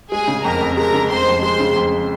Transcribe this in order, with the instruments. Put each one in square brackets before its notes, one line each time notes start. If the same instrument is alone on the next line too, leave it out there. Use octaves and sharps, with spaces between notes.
[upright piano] G#3 [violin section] G#4 G#5
[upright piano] C#3
[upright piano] F2 [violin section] A#4 A#5
[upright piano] F2
[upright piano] G#3 [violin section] A#4 A#5
[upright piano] C#3
[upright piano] F2 [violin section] C5 C6
[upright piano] F2
[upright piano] G#3 [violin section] C5 C6
[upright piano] C#3
F2